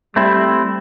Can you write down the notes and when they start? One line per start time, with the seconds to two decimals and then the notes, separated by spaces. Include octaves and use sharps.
0.16 G3 A3 C4 E4